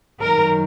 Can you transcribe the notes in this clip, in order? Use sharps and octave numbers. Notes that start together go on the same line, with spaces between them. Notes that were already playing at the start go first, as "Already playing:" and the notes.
F#2 D#3 F#3 A#4